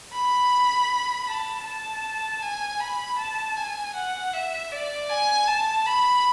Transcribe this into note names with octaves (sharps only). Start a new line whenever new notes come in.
B5
A5
A5
G#5
B5
A5
G#5
F#5
E5
D5
G#5
A5
B5